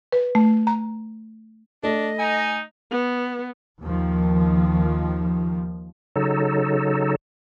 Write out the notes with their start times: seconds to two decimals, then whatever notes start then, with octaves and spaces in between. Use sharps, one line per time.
0.13 B4
0.35 A3
0.67 A#5
1.83 A3 D4 D#5
2.19 D#4 G#5
2.91 B3
3.82 D#2 D#3 F3
6.16 C#3 F#3 D#4 A4